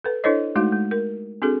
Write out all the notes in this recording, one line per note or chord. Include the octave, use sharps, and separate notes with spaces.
A4 B4
D4 E4 A4 C5 C#5 D#5
G#3 A3 D#4 F#4 F5
G#3
A#4
C4 D4 F#4 G#4 A4